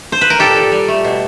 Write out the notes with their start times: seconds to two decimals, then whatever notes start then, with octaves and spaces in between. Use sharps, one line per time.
0.12 C5
0.21 B4
0.30 A#4
0.39 A#2 G4 A4
0.56 A#2
0.72 G3
0.88 A3
1.04 B2